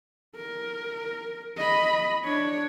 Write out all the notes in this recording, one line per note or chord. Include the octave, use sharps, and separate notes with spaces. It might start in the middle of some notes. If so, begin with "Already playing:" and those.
A#4
D#5 B5
D4 C#5